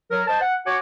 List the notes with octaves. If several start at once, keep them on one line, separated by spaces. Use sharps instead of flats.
F#3 A#4
C5 D#5 A5
F#5
F#4 C#5 F#5 G#5 D6